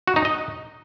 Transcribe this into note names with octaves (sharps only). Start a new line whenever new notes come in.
F#4
D#4
D#5